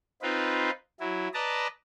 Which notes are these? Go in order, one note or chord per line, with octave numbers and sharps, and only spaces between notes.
C4 D#4 F4 B4
F#3 E4
B4 D5 D#5 A5 A#5